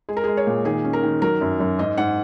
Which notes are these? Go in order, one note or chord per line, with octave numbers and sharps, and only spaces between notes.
G#3 G#4
A#4
G#3 G#4
C#5
A#2
D#3 G#4
C#4
A#4
D#3
F#3 A#4
F#2
F#2
G#2 D#5
G#2 F#5